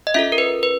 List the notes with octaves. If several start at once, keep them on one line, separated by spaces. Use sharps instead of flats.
D#5
C#4 F4 A4 E5
A#4
B4
B4